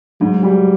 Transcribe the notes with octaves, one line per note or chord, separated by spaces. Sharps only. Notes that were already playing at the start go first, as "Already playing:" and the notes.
G#2 F#3
G3